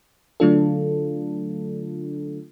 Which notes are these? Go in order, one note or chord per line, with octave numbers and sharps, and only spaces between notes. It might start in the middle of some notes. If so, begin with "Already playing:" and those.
D3 F#3 A3 D4 F4 A4